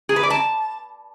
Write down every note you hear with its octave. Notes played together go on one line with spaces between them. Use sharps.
G#4
B4
D5
A5